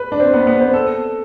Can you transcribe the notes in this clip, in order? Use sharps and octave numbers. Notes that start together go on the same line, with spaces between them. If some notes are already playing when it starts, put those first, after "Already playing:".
Already playing: B4
D4
C4
B3
B3
C4
A4